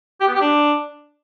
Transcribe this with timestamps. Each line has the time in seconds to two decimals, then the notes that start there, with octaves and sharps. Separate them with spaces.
0.21 G4
0.27 B3
0.34 G4
0.41 D4